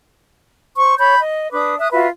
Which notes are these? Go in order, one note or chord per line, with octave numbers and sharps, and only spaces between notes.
C5 C#6
C#5 B5 G6
D#5
D4 B4 D6 D#6
E5 D#6 F#6
F4 F#4 B4 E5